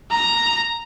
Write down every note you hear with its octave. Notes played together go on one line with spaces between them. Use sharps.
A#5